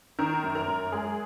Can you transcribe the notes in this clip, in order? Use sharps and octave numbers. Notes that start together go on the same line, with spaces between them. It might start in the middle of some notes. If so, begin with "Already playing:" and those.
D#3 A#4
F#2
A#4
F#2
G#3 G#4